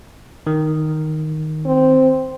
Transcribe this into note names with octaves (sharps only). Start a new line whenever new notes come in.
D#3
C4